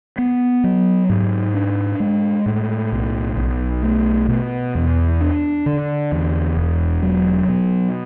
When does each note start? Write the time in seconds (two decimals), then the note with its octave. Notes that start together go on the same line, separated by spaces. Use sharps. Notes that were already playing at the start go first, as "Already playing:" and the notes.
0.18 B3
0.64 F#3
1.09 G#2
1.54 D4
2.00 G#3
2.46 A2
2.92 B1
3.37 B1
3.83 A3
4.28 B2
4.75 E2
5.21 D4
5.66 D3
6.12 E2
6.57 E1
7.02 F#3
7.48 B2